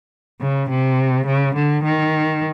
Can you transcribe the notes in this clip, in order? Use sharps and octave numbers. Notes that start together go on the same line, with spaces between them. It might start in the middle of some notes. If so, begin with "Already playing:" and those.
C#3
C3
C#3
D3
D#3